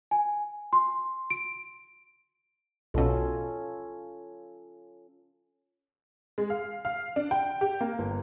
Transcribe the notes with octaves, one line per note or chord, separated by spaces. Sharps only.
G#5
C6
D7
B1 B2 C#4 F4 A4
G#3
F5
F5
D4
G5
G4
A#3
G1